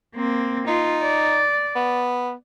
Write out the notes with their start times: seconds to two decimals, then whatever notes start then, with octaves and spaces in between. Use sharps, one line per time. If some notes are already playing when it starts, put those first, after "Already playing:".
0.15 A#3 C4
0.67 D#4 F4
1.02 D5
1.75 B3